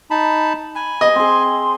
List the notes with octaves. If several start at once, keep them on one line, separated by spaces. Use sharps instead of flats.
D#4 A5 B5
G#5 B5
D#5
C4 G#4 C6